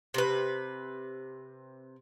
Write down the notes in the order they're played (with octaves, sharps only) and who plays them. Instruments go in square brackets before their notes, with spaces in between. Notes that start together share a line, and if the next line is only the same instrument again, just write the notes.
[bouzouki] C3 B4